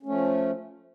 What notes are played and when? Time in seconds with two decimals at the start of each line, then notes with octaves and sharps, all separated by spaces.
0.03 C#4
0.06 A3
0.09 F3